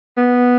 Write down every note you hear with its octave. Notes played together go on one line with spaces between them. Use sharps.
B3